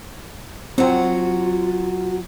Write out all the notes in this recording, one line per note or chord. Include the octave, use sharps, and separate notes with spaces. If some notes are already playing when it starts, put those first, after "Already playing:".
F#3 C4 F4 F#4